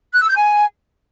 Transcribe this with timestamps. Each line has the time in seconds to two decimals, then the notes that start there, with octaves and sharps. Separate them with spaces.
0.14 F#6
0.21 E6
0.28 G6
0.36 G#5